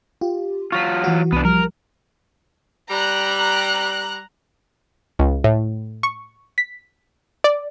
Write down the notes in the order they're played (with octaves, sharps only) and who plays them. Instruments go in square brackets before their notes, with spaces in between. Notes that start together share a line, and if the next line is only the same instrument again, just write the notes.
[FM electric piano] F4 G4
[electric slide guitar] F#3 F4 [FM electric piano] C#6 A#6 B6
[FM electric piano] E3 F#4
[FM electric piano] C2 [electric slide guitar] B3 D4
[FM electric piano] F3 G3 [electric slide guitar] A#4
[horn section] G3 [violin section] A#5 F#6
[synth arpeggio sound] C#2
A2
C#6
B6
D5